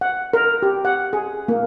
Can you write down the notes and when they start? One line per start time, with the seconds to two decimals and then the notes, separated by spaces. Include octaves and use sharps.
0.01 F#5
0.33 A#4
0.62 G4
0.85 F#5
1.13 G#4
1.48 A#3